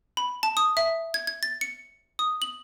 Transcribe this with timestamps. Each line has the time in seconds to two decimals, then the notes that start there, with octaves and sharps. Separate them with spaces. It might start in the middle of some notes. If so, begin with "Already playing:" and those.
0.17 B5
0.43 A5
0.57 D#6
0.77 E5
1.14 G#6
1.27 G#6
1.43 A6
1.61 C#7
2.19 D#6
2.42 F#7